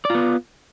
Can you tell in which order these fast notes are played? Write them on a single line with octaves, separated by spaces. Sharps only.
D5 F4 B3